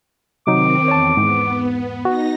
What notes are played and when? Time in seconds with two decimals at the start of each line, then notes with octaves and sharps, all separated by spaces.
0.47 C3 D#3 F#3 C4 D#4 D6
0.88 E2 C#5 A5
1.17 E2 G#2 B3
2.05 D#4 F#4 A#6